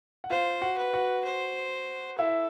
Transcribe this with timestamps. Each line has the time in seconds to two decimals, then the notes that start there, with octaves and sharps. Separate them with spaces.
0.24 F#5
0.30 F4 C5 F5
0.61 F#4 F#5
0.77 B4
0.93 F#4 F#5
1.25 C5
2.19 E4 A4 E5